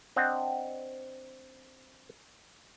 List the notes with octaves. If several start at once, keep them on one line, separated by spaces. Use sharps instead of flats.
C4 D4 D#5 F#5